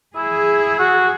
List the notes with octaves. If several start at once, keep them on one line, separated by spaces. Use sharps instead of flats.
E4 G#4
F#4